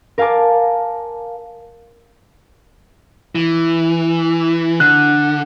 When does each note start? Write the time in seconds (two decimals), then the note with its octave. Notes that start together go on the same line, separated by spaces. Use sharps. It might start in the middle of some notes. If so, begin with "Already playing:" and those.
0.18 A#4 F5 G#5 A5 D6
3.35 E3
4.80 D3 F#6